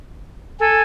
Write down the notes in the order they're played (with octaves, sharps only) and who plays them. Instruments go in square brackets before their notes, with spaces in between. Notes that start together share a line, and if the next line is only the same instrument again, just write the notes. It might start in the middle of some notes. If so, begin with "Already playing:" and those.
[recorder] A4 [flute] G#5